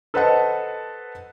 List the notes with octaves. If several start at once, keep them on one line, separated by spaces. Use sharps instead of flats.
A4 B4 C5 D#5 F#5 A5